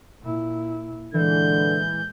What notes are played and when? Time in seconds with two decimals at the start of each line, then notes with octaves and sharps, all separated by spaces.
0.22 A#2 E4
1.14 A#2 D3 E3 G#3 G6